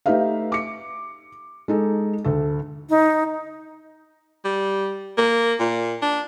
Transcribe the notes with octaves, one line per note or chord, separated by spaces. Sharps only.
A3 D#4 G4 B4 E5 F5
D6 C#7
G#3 D#4 A4
D2 A4
D#4
G3
A#3
A#2
D4